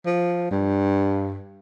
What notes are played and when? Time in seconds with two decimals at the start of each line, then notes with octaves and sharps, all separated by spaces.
0.06 F3
0.51 G2